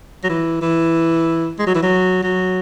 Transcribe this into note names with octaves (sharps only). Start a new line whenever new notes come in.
F#3
E3
E3
G#3
F#3
E3
F#3
F#3